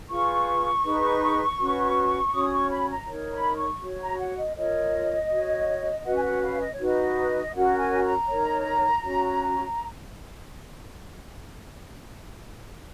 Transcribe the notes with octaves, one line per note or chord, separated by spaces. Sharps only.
F4 G#4 B4 C#6
D#4 G#4 B4
C#4 F#4 B4
C#4 F#4 C#5 D#6
C#6
B5
A#5
D#4 A#4 C#5
B5
C#6
F#4 C#5
A#5
F#5
D#5
F4 A#4 C#5 D#5
F#4 C#5
C#4 F#4 B4 F#5
G#5
F#5
F5
D#5
C#5
D#4 F#4 B4
D#5
C#4 F#4 A#4 C#5 F#5
G#5
A#5
D#4 A#4 C#5
C#4 F#4 C#5